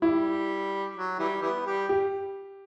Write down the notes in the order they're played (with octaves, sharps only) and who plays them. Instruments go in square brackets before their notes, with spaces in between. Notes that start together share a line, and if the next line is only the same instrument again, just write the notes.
[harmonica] G3 [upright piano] E4
[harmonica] F#3
E3 G3
E3 G3 B3
G3 G4
[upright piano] G4